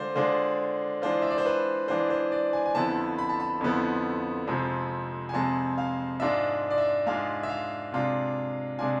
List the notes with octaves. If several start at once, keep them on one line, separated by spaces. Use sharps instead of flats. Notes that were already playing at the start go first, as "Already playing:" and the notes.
Already playing: D3 G#3 D4 F4 C5 D5
D3 G#3 D4 F4 C5
E3 G#3 D4 F4 C5
E5
D5
C5
B4
E3 G#3 D4 F4 C5
C5
D5
G#5
G#5
F2 D3 F3 B3 E4 A5
B5
A5
B5
F2 D3 F3 B3 E4
F2 C3 F3 G#3
G#5
F2 C3 F3 G#3 A5
F5
G#2 G#3 D4 F4 E5
D5
E5
G#2 G#3 D4 F4 F5
E5
F5
C3 G#3 D4 F4
C3 G#3 D4 F4 G#5